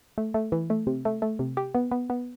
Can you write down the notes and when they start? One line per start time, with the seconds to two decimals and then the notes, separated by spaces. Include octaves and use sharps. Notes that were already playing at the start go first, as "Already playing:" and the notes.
0.18 A3
0.34 A3
0.52 E3
0.70 A3
0.87 C3
1.05 A3
1.22 A3
1.39 C3
1.57 G4
1.75 B3
1.91 B3
2.10 B3